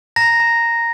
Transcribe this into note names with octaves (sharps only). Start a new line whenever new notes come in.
A#5 A#6
A#5